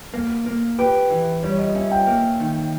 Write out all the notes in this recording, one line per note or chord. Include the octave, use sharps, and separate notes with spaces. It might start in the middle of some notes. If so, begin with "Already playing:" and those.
A#3
A#3
G4 B4
E3
G3 C#5
D#5
C#4 E5
G5
A#3
D#3